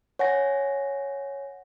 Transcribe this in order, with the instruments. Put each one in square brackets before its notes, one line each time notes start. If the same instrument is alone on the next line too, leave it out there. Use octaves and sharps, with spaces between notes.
[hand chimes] C#5 F#5 G#5 A#6